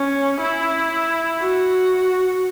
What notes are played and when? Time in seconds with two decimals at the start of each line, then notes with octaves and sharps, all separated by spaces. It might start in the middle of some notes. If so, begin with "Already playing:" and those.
Already playing: C#4
0.41 E4
1.40 F#4